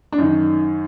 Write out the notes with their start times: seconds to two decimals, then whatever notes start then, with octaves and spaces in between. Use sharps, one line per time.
0.13 D4
0.18 F#2 D#3 D#4